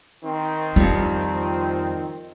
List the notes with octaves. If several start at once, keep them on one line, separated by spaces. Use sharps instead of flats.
D#3 C4
F2 G3 F4